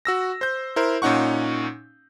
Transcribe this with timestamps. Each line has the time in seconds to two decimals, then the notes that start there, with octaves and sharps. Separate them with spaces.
0.05 F#4 E6 A#6
0.41 C5 G6
0.76 E4 A#4 C5
1.02 A#2 C#4 D#4 F#5 C#6